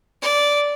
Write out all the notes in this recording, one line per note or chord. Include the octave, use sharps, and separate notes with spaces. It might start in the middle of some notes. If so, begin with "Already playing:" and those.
D5